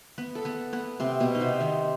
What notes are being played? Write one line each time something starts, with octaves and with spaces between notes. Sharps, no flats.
B3 B4
A4
B3 B4
B3 B4
C3 C4
B2 B3
D#4
C3 C4
D#3 D#4